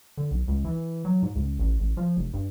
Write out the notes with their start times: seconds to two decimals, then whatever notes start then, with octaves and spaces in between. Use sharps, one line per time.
0.18 D3
0.31 B1
0.48 C#2
0.65 E3
1.05 F#3
1.22 G#2
1.35 C#2
1.59 A1
1.79 A1
1.97 F3
2.17 F1
2.33 G2